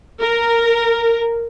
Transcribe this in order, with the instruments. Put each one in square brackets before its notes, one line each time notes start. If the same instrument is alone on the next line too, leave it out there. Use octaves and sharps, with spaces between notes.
[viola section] A#4